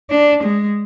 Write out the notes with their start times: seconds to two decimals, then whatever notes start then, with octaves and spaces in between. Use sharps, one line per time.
0.10 D4
0.43 G#3